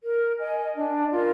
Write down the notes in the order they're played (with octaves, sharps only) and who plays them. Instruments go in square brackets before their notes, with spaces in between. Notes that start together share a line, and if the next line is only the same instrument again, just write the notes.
[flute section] A#4
D#5 G#5
D4
F4 A#4